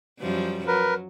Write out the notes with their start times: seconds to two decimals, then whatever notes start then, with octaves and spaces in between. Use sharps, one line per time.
0.19 F#2 F3 G3
0.67 F#3 A#4 B4